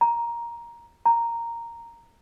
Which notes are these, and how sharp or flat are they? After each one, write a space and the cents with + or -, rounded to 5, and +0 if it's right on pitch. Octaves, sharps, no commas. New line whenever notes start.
A#5 +10
A#5 -5